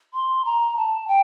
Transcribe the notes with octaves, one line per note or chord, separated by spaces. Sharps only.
C6
A#5
A5
G5